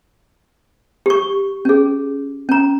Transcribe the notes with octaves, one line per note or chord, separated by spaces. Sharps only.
G4 C#6
C#4 G#4
C#4 A#5